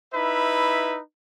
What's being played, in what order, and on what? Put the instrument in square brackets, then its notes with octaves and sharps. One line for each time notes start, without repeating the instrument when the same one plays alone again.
[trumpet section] D#4 E4 B4 E5 B5